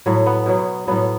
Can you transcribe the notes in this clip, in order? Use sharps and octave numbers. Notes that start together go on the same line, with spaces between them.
A2 F#3
B3
B2 F#3
A2 F#3 B3